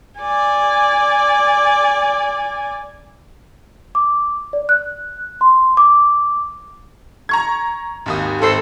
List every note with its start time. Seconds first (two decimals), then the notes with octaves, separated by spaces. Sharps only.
0.20 D5 G#5
3.95 D6
4.53 D5
4.69 F#6
5.41 C6
5.77 D6
7.29 A#5 C#6 G#6
8.06 G#1 D#2 D#6
8.42 G#1 A4 C5 C7